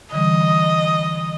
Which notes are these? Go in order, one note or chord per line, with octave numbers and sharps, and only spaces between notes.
D3 E3 G3 D#5